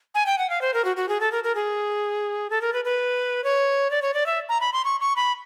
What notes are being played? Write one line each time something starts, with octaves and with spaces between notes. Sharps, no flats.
G#5
G5
F#5
F5
C5
A#4
F#4
F#4
G#4
A4
A#4
A#4
G#4
A4
A#4
B4
B4
C#5
D5
C#5
D5
E5
A#5
B5
C6
C#6
C#6
B5